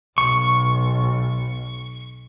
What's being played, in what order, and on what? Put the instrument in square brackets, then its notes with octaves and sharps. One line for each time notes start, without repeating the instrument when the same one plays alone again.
[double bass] B1 [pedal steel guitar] C#6